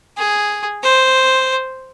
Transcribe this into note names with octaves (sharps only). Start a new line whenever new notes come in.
G#4
C5